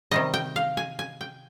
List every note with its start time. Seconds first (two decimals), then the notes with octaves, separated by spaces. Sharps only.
0.11 C3 D#3 G3 D#5
0.34 G5
0.56 F5
0.77 G#5
0.99 G#5
1.21 G5